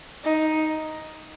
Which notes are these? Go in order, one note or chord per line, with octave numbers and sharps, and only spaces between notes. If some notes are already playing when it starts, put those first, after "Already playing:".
D#4